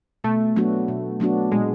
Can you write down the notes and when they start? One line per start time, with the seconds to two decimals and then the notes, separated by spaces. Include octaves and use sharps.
0.24 B2 A3
0.56 F#3 B3 D4 F#4
0.88 B2
1.20 F#3 B3 D4 F#4
1.52 A#2 G#3